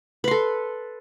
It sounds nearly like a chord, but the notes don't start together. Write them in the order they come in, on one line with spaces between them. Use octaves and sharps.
B4 C6 A4